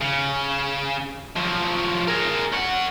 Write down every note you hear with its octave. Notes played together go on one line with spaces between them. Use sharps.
C#3
F3 F#3
G#4 A#4
C#4 F#5